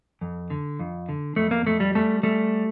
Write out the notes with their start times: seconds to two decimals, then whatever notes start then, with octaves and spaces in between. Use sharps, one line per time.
0.21 F2
0.50 D3
0.79 F2
1.09 D3
1.36 F2 A3
1.51 A#3
1.66 F2 A3
1.80 G3
1.95 G3 A3
2.23 G3 A3